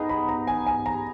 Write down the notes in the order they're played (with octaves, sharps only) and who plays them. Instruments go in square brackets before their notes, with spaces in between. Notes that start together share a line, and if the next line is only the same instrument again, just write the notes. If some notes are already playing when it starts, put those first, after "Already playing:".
Already playing: [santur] B3 D#4 G#4 [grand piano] A#5
[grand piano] B5
A#5
G#5
G#5
A#5